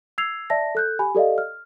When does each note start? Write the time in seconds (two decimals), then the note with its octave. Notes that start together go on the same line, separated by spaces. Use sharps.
0.18 E6 G#6 C7 F7
0.50 D5 E5 A5 A#6
0.75 A4 F#6 G6
0.99 G4 G#5 B5
1.15 G4 A4 D5 D#5 F5
1.38 F6